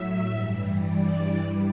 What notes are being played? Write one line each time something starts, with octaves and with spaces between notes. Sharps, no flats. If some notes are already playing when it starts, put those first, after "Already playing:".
Already playing: A2 F#3 E5
G2 E3 G3
D5
G2 E3 G3